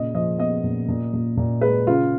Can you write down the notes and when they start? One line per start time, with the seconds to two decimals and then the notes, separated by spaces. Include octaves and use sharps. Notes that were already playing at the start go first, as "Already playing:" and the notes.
Already playing: A#2 C#3 D#5
0.14 F3 D#5
0.38 B3 D#5
0.64 A#2
0.88 A#2
1.13 A#2
1.37 A#2
1.61 G#3 B4
1.87 C#3 F4